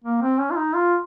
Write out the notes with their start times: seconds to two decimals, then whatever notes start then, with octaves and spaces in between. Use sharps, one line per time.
0.04 A#3
0.22 C4
0.39 C#4
0.51 F4
0.56 D#4
0.74 F4